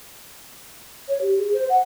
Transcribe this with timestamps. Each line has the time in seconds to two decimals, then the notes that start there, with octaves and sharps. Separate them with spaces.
1.08 C#5
1.22 G4
1.38 G#4
1.54 C5
1.70 F#5